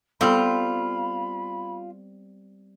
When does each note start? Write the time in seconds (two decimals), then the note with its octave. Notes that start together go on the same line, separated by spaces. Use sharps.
0.21 G3 B3 C4 F4 A4 B5